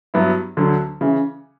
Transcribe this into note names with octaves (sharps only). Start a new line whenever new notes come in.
G2 F#3 B3 E4
D2 D3 F#3
C#3 E3